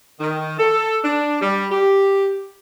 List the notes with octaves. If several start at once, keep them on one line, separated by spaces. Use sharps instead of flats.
D#3
A4
D4
G3
G4